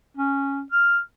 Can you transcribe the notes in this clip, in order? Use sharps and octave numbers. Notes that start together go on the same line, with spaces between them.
C#4
F6